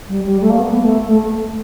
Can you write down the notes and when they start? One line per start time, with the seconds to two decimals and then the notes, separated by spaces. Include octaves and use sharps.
0.09 G3
0.26 G3
0.41 A3
0.50 A#3
0.58 B3
0.82 A3
1.07 A3